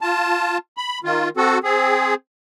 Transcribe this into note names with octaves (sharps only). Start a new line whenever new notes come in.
F4 A5
B5
D#3 F4
C4 F#4 A4
C4 G#4